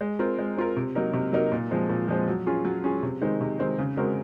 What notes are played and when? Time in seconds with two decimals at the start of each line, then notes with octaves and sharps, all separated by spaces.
0.01 G#3
0.19 C4 F4 A#4
0.39 G#3
0.57 C4 F4 A#4
0.76 C3
0.95 F#3 A#3 D#4 A#4
1.13 C3
1.33 F#3 A#3 D#4 A#4
1.52 A#2
1.71 F3 G#3 C4
1.89 A#2
2.08 F3 G#3 C4
2.28 F#3
2.46 C#4 F4 G#4
2.65 F#3
2.84 C#4 F4 G#4
3.03 C3
3.21 D#3 G#3 C4 D#4
3.41 C3
3.59 D#3 G#3 C4 D#4
3.79 C#3
3.97 G#3 C4 F#4 A#4